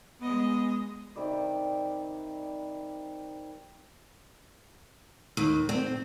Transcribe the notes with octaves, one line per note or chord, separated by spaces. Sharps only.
G#3 B3 D#5
C3 D#3 G3 D5
D#2
C4